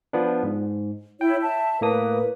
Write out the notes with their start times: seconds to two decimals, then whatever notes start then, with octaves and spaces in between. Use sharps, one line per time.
0.13 F3 B3 D4
0.43 G#2
1.21 E4 C#5 G5
1.42 E5 A5
1.81 A2 A#3 B4 D#6